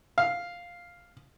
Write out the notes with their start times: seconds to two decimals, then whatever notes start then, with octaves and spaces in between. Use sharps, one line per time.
0.18 F5